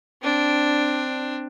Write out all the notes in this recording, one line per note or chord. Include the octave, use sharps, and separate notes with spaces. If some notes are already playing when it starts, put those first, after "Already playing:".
C4 D4